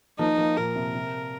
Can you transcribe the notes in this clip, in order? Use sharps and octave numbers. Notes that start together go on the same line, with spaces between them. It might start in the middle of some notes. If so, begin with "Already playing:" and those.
F3 A#3 D#4
F3 A#3
A#2 A#4
C3
C3